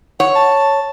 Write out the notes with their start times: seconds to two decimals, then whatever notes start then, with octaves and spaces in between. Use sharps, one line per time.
0.20 C#5 F#5
0.36 A5